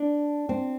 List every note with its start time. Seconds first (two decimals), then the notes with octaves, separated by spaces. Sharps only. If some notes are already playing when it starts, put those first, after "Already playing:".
Already playing: D4
0.49 C4